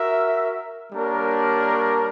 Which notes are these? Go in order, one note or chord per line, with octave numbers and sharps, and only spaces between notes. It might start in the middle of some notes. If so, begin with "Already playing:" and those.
Already playing: F#4 A#4 E5
G3 A#3 D4 A#4 C#5